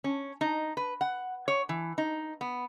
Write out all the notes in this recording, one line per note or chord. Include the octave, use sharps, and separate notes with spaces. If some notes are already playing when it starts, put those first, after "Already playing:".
C#4
D#4
B4
F#5
C#5
E3
D#4
B3